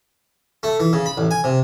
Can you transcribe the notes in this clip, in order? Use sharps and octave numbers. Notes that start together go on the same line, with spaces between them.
A3
E3
C#3
B5
A1
G#5
C3